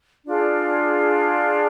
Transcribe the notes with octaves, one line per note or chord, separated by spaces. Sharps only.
D4 F4 G#4